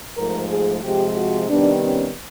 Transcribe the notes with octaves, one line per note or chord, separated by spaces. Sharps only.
G#2 F3 A3 A#4
G#4
C3 F3 G#3 G4
F#4
C3 D#3 G3 B3 D4
C#4